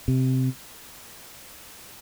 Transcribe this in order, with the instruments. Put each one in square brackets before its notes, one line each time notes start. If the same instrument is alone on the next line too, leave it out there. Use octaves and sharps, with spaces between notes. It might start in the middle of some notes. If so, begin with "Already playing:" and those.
[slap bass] C3